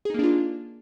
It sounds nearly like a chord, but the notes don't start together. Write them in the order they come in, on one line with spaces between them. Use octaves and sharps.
G#4 D#4 A#3 D4 F4